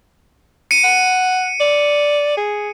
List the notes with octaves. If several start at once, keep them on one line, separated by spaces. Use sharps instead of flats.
C#7 D#7
F#5
D5
G#4